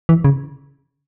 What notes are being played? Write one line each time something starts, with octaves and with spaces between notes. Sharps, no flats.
E3
C#3